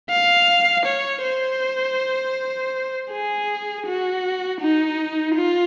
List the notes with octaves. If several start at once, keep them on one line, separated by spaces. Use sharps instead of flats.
F5
C#5
C5
G#4
F#4
D#4
F4